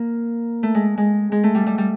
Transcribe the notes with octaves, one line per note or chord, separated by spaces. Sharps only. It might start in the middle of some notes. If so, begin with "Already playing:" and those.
Already playing: A#3
A3
G#3
G#3
G#3
A3
G3
G3
G3